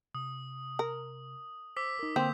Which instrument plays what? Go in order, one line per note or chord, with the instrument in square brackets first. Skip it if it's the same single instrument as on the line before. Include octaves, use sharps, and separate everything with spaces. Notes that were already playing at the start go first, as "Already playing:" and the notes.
[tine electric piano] C3 [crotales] D#6
[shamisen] A#4
[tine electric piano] C5 [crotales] D6 E6 B6
[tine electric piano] D#4 A#4
[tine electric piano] D3 A#3 D#6 [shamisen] C4 [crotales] G6